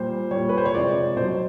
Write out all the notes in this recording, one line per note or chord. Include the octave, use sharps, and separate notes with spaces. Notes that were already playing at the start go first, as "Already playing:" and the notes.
Already playing: A#2 G3 C5
A#2 G3 C#5
B4
C5
C#5
C3 F3 G#3 D5
B2 F#3 C5